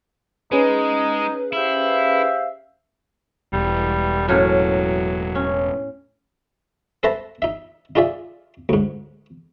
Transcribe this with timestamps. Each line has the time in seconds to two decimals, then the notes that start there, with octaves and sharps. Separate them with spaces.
0.52 G#3 C#4 D#4 G#4 B4
1.53 E4 G4 C5 E5 F5
3.53 E1 G3
4.28 A2 F#3 A#3 C#4
5.35 C#4
7.03 A4 B4 C5 E5 A5 A#5
7.42 D#4 E5
7.95 D#4 F4 G#4 D5 E5
8.69 D2 G#2